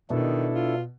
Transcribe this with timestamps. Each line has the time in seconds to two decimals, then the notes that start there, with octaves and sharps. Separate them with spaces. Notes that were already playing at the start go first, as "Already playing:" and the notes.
0.10 B2 D#3 D4 E4 A4
0.54 F4